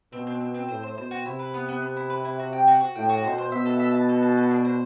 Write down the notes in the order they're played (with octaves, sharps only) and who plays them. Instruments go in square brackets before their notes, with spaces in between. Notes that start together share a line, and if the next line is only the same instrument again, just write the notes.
[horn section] B2 [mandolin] C4
[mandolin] C4
C4
C4
[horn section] A2 [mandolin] C5
[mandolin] C5
[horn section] B2 [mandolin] C5
[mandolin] F#4
[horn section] C3 [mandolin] E4
[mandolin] B4
B3
B3
B3
E4
B4
E4
F#4
G5
F#4
F#4
[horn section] A2 [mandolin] G5
[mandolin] F#4
[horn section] B2 [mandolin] C5
[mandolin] C5
[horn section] B2 [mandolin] E5
[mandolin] A4
E5
A5
A4
A5
A4
D4
C5